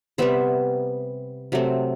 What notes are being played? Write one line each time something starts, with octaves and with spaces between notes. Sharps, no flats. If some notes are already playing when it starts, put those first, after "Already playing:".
C3 G3 B3 C5 E5
C3 F#3 A3 C4